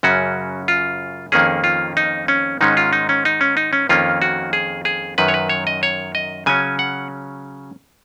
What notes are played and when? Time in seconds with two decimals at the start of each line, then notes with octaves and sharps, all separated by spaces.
0.03 F#2 C#3 F#3 C#4 F#4
0.68 F4
1.32 F2 D#3 A#3 C#4 G#4
1.64 F4
1.97 D#4
2.28 C#4
2.61 G#2 D#3 G#3 C#4 D#4
2.77 F4
2.93 D#4
3.09 C#4
3.25 D#4
3.41 C#4
3.57 D#4
3.73 C#4
3.89 F2 D#3 A#3 C#4 F4
4.22 F#4
4.53 G#4
4.85 G#4
5.18 F#2 D#3 F#3 B4
5.28 C#5
5.34 B4
5.49 C#5
5.67 D#5
5.83 C#5
6.15 D#5
6.46 C#3 F#3 C#4 G#5
6.79 F#5